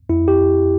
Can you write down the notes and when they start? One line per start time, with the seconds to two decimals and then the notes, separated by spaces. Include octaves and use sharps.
0.09 F2 E4
0.28 G4